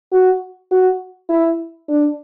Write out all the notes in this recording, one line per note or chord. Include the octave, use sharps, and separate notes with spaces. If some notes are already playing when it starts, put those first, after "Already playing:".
F#4
F#4
E4
D4